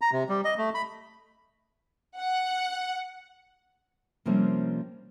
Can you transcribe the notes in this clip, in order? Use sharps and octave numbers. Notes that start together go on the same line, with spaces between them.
A#5
C3
G3
D#5
A3
B5
F#5
C3 F3 G3 A#3 C4 C#4